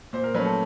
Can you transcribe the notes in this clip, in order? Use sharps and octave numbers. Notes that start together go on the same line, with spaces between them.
A#2 C5
A#4
F#3 A3 C#4 B4
A4